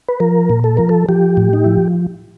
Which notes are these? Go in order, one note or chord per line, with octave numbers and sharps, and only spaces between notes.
B4
F3 A#4
A#2
A4
F3 A#4
A4
F3 G4
A2
D#4
F3 E4